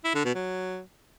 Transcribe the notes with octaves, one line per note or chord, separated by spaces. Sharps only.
E4
D3
B2
F#3